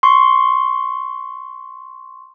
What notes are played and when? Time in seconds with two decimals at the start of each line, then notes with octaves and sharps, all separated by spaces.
0.03 C6 C#6